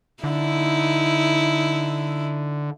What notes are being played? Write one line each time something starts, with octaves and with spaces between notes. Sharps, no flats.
D3 D#4 E4